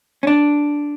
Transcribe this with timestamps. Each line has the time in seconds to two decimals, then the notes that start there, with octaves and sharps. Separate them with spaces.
0.23 C#4
0.27 D4